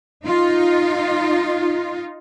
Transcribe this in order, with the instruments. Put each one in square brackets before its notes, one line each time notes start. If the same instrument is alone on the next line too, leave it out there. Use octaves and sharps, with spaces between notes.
[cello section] D#4 F4